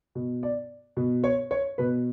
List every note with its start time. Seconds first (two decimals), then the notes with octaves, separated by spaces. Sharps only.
0.15 B2
0.43 D5
0.97 B2
1.24 C#5
1.51 C#5
1.78 B2 B4